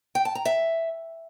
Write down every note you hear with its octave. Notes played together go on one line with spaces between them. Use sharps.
G5
A5
A#5
E5